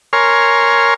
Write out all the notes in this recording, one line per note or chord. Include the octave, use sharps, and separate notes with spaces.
A#4 C#5 G#5 C6 F6